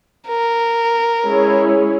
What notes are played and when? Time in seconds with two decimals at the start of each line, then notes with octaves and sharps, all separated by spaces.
0.28 A#4
1.24 G#3 C#4 E4 G#4 C#5